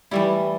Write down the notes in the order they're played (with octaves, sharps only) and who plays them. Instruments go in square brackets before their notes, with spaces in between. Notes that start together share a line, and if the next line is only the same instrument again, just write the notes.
[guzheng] E3 A3 E4 [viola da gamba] G3